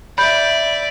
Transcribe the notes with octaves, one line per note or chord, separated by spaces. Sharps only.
D5 E5 B5 G6